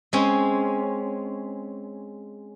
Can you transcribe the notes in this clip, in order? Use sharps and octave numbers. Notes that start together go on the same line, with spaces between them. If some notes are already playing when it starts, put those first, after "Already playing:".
G#3 C4 C#4